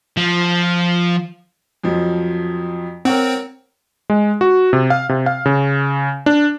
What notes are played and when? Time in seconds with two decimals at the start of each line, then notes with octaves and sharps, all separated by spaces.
0.17 F3
1.84 F2 F3 F#3
3.05 C4 A#4 C#5 F#5
4.10 G#3
4.41 F#4
4.73 C3
4.90 F5
5.09 C3
5.26 F5
5.46 C#3
6.26 D4